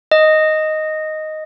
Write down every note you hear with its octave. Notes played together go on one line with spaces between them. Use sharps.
D#5